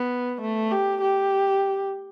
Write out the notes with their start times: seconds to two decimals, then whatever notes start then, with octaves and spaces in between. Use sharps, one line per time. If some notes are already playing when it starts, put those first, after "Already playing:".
Already playing: B3
0.41 A3
0.72 G4
1.01 G4